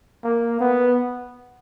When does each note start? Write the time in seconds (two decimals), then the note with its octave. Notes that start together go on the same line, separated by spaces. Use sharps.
0.24 A#3
0.61 B3